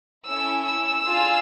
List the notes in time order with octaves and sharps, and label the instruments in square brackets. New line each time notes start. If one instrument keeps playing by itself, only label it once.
[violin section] C#4 E4 A4 E6
E6
D4 F4 G#4